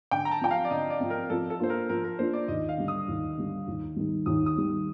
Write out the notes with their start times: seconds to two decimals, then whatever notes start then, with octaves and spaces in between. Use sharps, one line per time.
0.11 D3 G5
0.25 A#5
0.31 A5
0.41 F3 C4 G5
0.51 F5
0.65 D5
0.70 D3 D#5
0.90 D5
1.00 F3 C4
1.10 A#4
1.30 F3 A4
1.50 A4
1.60 A#3 D4 F4 C5
1.70 A#4
1.89 F3 A#4
2.04 A#4
2.19 A#3 D4 F4 C5
2.33 D5
2.48 D#2 D#5
2.69 F5
2.78 D3 G3
2.88 D#6
3.08 D#2
3.38 D3 G3
3.68 D#2
3.96 D#3 G3
4.26 D#2 D#6
4.46 D#6
4.57 D#3 G3